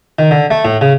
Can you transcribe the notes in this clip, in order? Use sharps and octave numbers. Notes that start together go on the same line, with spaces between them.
D#3
D3
A3
A2
C#3